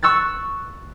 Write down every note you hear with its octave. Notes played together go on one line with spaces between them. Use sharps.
C#6 E6 F#6 A6